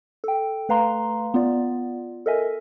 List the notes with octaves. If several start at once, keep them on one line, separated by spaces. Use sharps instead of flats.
A4 G5
A3 B4 F5 A#5 C6
B3 F4 D5
A4 A#4 D#5 E5 G#5